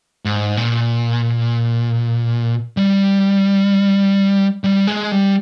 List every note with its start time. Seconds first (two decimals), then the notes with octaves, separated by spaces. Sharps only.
0.25 G#2
0.57 A#2
2.77 G3
4.64 G3
4.87 G#3
5.12 G3